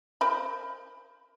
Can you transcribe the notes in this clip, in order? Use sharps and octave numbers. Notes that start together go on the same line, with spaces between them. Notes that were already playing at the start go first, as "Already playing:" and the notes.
A#4 C5 B5